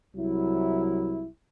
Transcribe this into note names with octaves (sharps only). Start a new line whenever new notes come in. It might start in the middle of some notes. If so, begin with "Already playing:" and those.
C2 F#3 E4